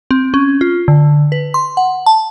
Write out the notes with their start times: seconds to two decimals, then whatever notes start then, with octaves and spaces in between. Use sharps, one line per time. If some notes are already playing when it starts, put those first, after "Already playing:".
0.11 C4
0.34 C#4
0.61 F4
0.88 D3
1.32 B4
1.54 C6
1.77 F#5
2.06 A5